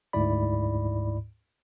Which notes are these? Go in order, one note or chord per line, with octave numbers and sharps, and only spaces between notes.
D2 G#2 E4 D5 B5